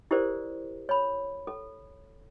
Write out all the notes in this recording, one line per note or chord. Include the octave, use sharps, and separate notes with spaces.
E4 G4 A4 A#4 C5 D5
C#5 B5
A4